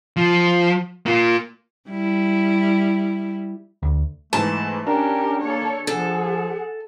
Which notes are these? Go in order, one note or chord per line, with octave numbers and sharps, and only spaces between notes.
F3
A#3 F4
G3 E4
D2
G#2 E3 A3 A5
C#4 D4 G4 A#4
A#3 A4 C#5
F3 G#4 A4 F#5